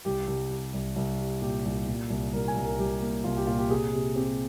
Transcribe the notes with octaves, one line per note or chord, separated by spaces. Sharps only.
C2 G4
C2
G3
C2
C2
G3
A#2 G4
C2
A#2
C2
C2 A#4
G#5
C2
A#4
C2 G4
A#3
C2 F4
G4
A#2 F4
G4
C3 G#4
C3
C4 G4